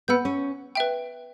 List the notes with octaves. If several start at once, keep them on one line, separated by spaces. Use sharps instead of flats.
B3 F#5 B5 E6 G6
C#4
B4 E5 G5